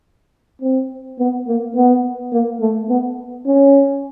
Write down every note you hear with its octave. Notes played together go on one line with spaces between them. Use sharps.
C4
B3
A#3
B3
A#3
A3
B3
C#4